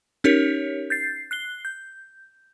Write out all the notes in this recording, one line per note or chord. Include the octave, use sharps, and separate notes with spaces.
C#4 D#4 G4 A#4 C#5
G6 A6 C7
F#6 C7 G7
G6